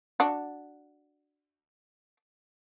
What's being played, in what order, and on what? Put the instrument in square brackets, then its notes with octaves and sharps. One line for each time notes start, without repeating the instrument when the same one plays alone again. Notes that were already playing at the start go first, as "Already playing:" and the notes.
[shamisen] D4 F#4